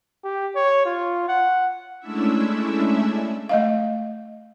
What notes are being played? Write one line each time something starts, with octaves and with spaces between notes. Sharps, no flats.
G4
C#5
F4
F#5
G#3 A3 C#4 D4 E4 E5
A3 D#5 F5